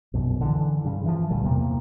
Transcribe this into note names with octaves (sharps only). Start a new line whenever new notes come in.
A#1 F#2 B2
D3 E3
G2 C#3
E3 F3
D2 A#2 G3
E2 C3 A#3